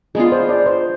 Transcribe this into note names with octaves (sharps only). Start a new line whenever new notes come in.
G#3 B3 D4 F4 G#4
C5
D5
C5